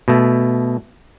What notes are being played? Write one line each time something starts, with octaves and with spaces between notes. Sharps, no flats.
B2 A3